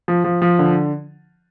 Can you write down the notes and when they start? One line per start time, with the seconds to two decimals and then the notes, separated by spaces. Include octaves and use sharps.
0.08 F3
0.24 F3
0.42 F3
0.59 D3